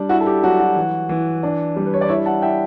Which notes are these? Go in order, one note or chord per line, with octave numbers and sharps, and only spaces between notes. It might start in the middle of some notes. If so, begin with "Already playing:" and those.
Already playing: G3 D4
E4 F#4
A4
G4
F#3 F#4 A4
F#4
E3
E3
D4
G3
B4
C#5
D5
E4 C#5 E5
F#5 A5
E4 E5 G5